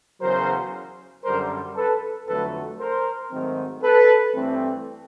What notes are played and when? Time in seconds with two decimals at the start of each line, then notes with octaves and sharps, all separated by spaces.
0.21 E2 C#3 F#3 A#4 C5
1.24 F#2 D3 G3 A#4 C5
1.76 A4 B4
2.28 F2 D3 F#3 A3 A4 B4
2.80 A#4 C5
3.32 G#2 D#3 F#3 A3 C4
3.83 A4 B4
4.34 G2 E3 A3 C4